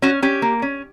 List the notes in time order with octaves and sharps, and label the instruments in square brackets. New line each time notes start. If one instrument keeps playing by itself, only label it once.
[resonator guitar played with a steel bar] C#4 F#4
C#4 G4
A#3
C#4